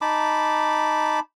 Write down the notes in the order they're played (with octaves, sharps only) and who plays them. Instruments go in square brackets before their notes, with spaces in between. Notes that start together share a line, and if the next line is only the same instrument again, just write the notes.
[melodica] D#4 A5 B5 D6